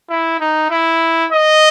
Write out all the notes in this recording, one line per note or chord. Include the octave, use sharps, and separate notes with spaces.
E4
D#4
E4
D#5